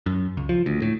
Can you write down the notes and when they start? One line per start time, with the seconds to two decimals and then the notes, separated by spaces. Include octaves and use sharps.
0.06 F#2
0.37 C#2
0.49 F3
0.66 D2
0.82 A2